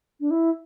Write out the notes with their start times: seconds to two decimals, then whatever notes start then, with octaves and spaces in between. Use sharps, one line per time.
0.21 D4
0.31 E4